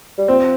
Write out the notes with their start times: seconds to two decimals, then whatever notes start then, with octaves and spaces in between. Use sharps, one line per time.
0.18 G3
0.28 F3 C4